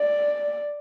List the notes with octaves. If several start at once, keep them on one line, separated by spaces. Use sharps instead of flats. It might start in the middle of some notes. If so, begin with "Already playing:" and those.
Already playing: D5